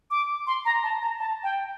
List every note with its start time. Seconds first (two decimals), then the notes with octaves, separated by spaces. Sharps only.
0.11 D6
0.47 C6
0.65 A#5
0.83 A5
1.01 A#5
1.19 A5
1.43 G5